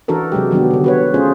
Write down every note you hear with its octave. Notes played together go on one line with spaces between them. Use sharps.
E3 D4 F#4 A4 A#4
C3 F#3 G#3 G4
D#3 F#3 G3 B3 D4
D3 G3
F#4 B4 C#5
A3 C#4 F4 G#4 C5